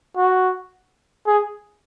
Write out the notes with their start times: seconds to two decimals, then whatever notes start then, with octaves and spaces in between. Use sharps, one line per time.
0.17 F#4
1.27 G#4